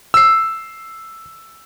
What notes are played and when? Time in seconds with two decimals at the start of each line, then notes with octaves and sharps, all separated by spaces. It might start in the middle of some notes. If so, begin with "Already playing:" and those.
0.14 E6 C7